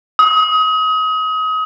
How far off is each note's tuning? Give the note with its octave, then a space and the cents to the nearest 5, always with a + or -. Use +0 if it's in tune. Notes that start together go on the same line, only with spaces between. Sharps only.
D#6 +30